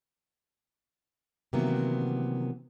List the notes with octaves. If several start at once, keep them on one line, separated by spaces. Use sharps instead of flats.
C3 D#3 E3 F#3 A#3 B3